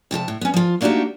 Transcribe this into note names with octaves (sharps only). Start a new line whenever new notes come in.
F2 C3 G#4 A5
A2
B3 C#4
F3 F4
A3 A#3 D4 D#4 F#4 G4